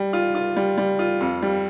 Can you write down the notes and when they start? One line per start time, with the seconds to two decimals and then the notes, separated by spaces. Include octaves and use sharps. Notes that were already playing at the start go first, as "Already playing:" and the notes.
Already playing: G3
0.13 F4
0.35 F4
0.56 G3
0.78 G3
0.99 F4
1.20 F2
1.42 G3